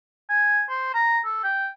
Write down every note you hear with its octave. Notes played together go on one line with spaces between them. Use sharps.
G#5
C5
A#5
A4
G5